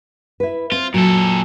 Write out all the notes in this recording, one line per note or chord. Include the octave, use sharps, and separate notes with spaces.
E4 B4
C4 F4
A#2 F#3 A4